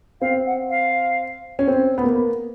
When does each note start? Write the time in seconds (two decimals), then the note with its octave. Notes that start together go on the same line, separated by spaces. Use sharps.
0.21 C4 F5
0.46 F#5
0.70 F5
1.59 C#4
1.68 C4
1.98 B3
2.04 A#3